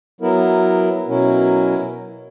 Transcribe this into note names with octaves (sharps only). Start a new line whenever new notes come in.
F#3 B3 E4 A#4
B2 F#3 C#4 E4 A#4